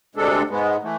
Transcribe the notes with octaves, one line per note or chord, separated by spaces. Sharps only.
D2 C3 G#3 D4 A4
G#2 G#3 B3
E3 A3